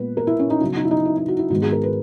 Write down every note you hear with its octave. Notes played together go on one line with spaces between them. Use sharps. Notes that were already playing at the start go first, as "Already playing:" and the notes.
Already playing: A#2 G#3 B3 B4
A#4
E4
C#4
D#4
C#3 F#3 B3 E4
D#4
E4
D#4
E4
D#4
F#4
E4
G#2 D#3 G#3 B3 F#4
G#4
A#4
B4